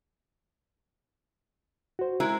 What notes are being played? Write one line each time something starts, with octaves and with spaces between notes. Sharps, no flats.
F#4 C5
G#3 E4 A#4